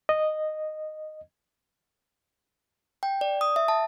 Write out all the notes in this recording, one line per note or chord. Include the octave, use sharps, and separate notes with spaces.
D#5
G5
D5
D#6
E5
A5